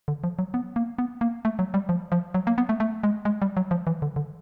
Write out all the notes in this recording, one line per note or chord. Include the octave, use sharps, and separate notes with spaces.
D3
F3
F#3
B3
A#3
B3
A#3
A3
F#3
G3
F3
F3
F#3
A#3
B3
A3
A3
G#3
G#3
G3
F#3
F3
E3
D3
D3